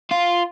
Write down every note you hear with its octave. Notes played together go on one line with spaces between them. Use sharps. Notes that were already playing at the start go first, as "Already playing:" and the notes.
F4